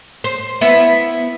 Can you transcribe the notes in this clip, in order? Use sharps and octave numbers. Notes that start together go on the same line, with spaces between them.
C5
B3 E4 E5